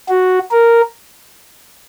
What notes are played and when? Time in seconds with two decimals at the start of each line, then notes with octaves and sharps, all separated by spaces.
0.09 F#4
0.51 A#4